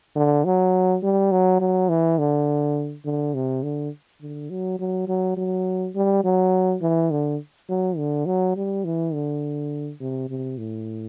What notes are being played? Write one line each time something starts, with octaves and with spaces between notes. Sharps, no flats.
D3
F#3
G3
F#3
F#3
E3
D3
D3
C3
D3
D3
F#3
F#3
F#3
F#3
G3
F#3
E3
D3
F#3
D3
F#3
G3
E3
D3
C3
C3
A2